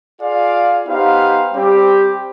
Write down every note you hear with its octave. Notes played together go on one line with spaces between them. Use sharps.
F4 G#4 D5 F5
B3 D#4 G4 C5 F5
G3 C4 G4